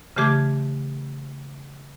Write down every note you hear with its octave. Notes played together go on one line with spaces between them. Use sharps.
C#3 E3 A3 G4 D6 G#6